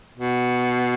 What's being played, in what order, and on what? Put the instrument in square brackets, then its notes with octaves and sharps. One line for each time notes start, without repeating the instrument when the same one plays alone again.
[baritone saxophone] B2